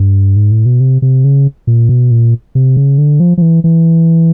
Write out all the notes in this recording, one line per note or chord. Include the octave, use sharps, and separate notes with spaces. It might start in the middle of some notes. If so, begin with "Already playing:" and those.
Already playing: G2
G#2
A2
B2
C3
C3
C#3
A#2
B2
A#2
C3
C#3
D3
F3
F3
E3
E3